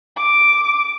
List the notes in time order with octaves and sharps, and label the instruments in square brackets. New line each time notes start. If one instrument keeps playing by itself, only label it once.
[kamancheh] D6